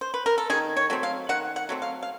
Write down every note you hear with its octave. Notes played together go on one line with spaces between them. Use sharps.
C5
B4
A#4
A4
D#3 G#4
C#5
F#3 A3 C4
F5
D#3 F#5
F#5
F#3 A3 C4
F5
F5